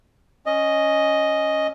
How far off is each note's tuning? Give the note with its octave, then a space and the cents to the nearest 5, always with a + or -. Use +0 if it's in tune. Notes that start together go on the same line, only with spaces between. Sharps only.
C#4 +0 D#5 +0